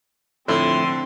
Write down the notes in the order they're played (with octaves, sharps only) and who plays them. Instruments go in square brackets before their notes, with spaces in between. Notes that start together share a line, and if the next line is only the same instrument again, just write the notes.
[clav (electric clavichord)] F2 A2 E4 [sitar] D3 [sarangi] C4 [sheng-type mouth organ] C6